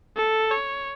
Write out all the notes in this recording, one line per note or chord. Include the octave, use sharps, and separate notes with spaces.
A4
C#5